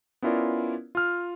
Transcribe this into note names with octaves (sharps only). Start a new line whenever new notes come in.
B3 C#4 E4 F4 A#4 D5
F4 F6